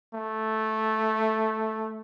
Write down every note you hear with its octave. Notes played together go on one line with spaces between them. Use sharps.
A3